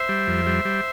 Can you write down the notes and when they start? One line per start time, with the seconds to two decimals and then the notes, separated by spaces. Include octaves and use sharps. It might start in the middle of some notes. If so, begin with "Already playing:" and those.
Already playing: C5 E5
0.09 G3
0.27 F2
0.47 G3
0.65 G3